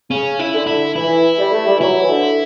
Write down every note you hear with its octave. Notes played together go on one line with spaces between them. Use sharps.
C#3 C#4
E4
D3
E4
E3 E4
G3
A3
G3
E3
F#3 E4
E3
D3